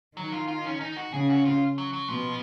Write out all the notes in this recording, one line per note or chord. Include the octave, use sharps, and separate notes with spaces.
D#3 F#3
F4
F4
C#4
D#4
F#4
C#3 G#4
F#4
F4
F#3
F#3
B2 F3